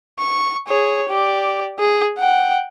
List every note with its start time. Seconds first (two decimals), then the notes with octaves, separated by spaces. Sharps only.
0.19 C#6
0.68 G#4 C#5
1.09 G4 D5
1.79 G#4
2.18 F#5 G5